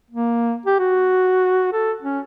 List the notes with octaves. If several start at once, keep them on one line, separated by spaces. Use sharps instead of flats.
A#3
G4
F#4
A4
C#4